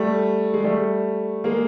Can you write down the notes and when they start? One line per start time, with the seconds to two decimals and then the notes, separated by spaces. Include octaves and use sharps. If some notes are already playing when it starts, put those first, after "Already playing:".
Already playing: G3 A3
0.54 G#3
0.64 G3 A3
1.44 G#3 A#3